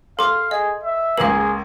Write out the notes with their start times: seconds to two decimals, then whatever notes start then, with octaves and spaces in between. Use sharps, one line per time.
0.19 A4 F5 C6 D6
0.51 G#4 D#5
0.83 E5
1.18 C#2 A#3 G#4 F5 F#7